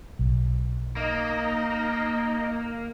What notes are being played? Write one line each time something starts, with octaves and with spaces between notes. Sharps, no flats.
B1
A#3 D#4 D#5